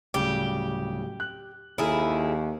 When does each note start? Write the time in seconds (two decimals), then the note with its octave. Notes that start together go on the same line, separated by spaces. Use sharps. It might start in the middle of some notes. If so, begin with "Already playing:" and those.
0.14 D1 C#3 G3 G4
1.20 F#6
1.78 D#2 E4 G#4 A4 A#5 F6